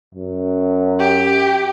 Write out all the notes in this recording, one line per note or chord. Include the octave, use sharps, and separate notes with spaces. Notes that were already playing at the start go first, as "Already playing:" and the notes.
F#2
G4